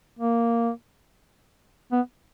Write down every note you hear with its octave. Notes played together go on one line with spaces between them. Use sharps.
A#3
B3